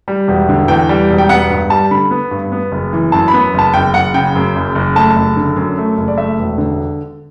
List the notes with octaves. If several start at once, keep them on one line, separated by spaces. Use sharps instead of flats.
G3
E1
D3
E2 G5
G3
E1
G5
B3 F#5
G2
G3 A5
D3 B5
B3
G2
B3
F#1
E3
F#2 A5
B5
B3
F#1 A5
F#1 G5
F#1 F#5
C#3 G5
F#2
F#1
F#1
A3 A5
F#1
D3
F#2
A3
F#1
D5
A3 E5
E1
D3